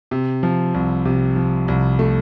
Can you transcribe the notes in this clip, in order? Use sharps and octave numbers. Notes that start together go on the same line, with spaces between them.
C3
F3
C2
C3
F3
C2
A3